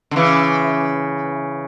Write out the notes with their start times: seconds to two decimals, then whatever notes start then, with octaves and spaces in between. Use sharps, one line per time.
0.11 D3
0.16 C#3 E3